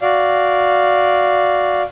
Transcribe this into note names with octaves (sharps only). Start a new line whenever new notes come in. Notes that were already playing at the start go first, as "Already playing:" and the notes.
F#4 D5 F5